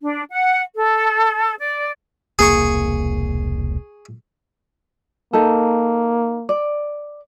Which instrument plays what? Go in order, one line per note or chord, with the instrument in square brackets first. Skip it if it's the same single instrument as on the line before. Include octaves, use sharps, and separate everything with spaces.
[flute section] D4
F#5
A4
D5
[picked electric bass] E1 C2 A#3 [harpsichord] G#4 C#6
[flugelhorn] A#3 [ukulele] D#4 A4
[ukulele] D5